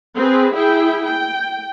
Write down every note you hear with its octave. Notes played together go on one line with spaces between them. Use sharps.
C4 G#4 B4
E4 G#4 G5
G5